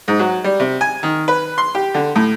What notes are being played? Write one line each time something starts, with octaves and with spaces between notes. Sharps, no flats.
G#2
F#3
G3
C3
G#5
D#3
B4
C6
G4
D3
A2